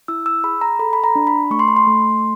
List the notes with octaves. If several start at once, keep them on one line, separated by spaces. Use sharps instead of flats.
E4 E6
E6
G#4 B5
A#5
A4 B5
B5
A#5
D4
B5
A3 C#6
C6
B5
C6
A3